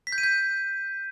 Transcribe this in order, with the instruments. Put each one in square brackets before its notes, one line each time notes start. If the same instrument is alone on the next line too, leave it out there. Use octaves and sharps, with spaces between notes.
[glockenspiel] B6
G6
D#7
G6